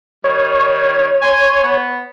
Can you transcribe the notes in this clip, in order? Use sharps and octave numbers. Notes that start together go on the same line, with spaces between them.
D#3 G3 C#5
G#5 C6
B3